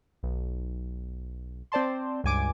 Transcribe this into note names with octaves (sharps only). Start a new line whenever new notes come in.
B1
C4 C5 D5 A5 C6
C#2 G2 G#5 D6 D7